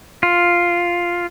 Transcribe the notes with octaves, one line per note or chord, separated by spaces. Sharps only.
F4